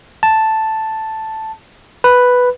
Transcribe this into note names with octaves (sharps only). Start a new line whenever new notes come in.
A5
B4